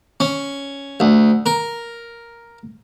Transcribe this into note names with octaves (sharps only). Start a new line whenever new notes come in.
C#4
D2
A#4